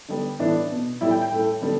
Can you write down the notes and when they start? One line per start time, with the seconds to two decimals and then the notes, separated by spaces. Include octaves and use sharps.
0.08 D3 G3 B3
0.39 A2 E3 B3 D4
0.70 B2 B3
1.01 A2 G3 B3 E4
1.11 G5
1.21 G5
1.31 A2 A3
1.61 D3 G3 B3